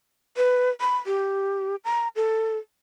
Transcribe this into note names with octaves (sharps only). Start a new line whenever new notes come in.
B4
B5
G4
A#5
A4